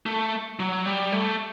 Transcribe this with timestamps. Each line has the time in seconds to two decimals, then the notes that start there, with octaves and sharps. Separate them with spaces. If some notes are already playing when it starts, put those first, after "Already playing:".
0.06 A3
0.59 F#3
0.86 G3
1.12 A3